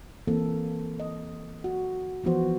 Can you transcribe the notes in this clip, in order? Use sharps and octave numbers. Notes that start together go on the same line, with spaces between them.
E3 A#3 C4 A4
D#5
F#4
E3 F3 B3 F#4 C5